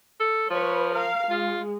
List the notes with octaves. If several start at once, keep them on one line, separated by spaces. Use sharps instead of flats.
A4
F3 B4 C#5
A#4 F5
G#3 F4